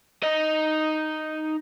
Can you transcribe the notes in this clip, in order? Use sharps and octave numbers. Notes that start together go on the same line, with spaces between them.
D#4 D#5